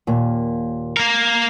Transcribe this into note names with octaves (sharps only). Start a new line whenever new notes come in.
D#2 A#2
A#3 A#4